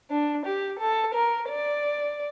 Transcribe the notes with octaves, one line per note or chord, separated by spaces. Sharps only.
D4
G4
A4
A#4
D5